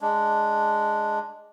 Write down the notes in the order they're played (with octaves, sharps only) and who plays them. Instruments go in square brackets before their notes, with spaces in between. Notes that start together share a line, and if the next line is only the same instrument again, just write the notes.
[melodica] G#3 D4